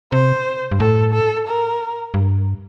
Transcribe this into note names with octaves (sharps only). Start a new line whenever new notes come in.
C3 C5
G2
A2 A4
A4
A#4
G2